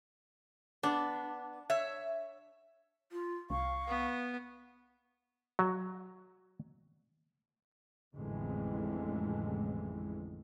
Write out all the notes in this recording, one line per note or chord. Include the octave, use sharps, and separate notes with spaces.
B3 D4
C#5 E5
F4
C2 F5 C#6
B3
F#3
A1 F2 A2 D3 E3 G#3